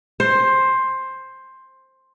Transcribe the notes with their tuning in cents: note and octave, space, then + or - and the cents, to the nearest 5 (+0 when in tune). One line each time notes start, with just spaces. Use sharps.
C5 +10